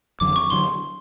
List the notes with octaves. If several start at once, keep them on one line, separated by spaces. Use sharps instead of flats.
F2 D3 F#3 D6
C#6
D3 F#3 C6